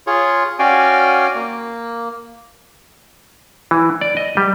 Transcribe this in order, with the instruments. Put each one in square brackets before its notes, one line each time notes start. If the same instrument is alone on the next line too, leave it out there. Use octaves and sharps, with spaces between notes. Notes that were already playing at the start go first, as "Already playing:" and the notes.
[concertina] F4 G#4 C#5
C#4 F#4 D5 F5 G5 G#5
A#3
[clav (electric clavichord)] E3
D5
D#5
G3